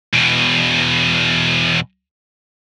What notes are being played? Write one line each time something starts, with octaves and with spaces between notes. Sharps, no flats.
E2 B2